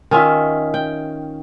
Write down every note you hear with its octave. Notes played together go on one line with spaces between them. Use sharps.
D#3 C#4 F4 E5
G5